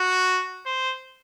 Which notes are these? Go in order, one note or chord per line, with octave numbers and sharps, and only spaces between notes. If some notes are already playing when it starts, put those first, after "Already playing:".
Already playing: F#4
C5